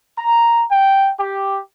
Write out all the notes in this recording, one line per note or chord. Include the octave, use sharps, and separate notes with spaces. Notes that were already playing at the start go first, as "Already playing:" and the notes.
A#5
G5
G4